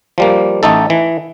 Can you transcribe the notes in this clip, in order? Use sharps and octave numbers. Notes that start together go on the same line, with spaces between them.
F3 G3 A#3
A1 A3 D#4 A4
E3